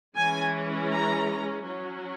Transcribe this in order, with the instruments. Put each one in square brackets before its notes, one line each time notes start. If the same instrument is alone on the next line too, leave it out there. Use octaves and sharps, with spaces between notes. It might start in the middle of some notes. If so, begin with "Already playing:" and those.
[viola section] E3 G#3 C#4 G#5
A#5
F#3 C#4